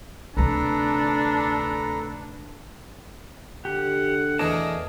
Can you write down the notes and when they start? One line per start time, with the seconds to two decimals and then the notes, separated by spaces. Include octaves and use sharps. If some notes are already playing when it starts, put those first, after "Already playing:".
0.37 D2 C3 D4 A4 B4 A#5
3.65 D3 G4 F#5
4.39 E2 B2 A3 G#4 A#4 D5 A5